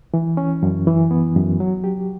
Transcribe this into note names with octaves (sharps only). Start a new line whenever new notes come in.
E3
C#4
F#2
E3
B3
F#2
F#3
G4